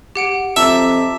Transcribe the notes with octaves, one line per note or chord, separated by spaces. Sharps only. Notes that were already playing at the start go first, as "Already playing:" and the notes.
G4 F#5 D7
F2 E5 A5 A#5 D6 E6